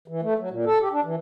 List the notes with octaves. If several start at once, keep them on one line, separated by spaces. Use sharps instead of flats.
E3
A3
F#3
A#2
A4
G4
D4
E3